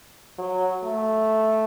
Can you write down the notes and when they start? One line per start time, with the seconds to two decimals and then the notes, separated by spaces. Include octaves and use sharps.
0.38 F#3
0.84 A3